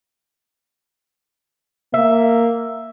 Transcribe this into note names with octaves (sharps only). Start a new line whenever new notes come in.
A#3 E5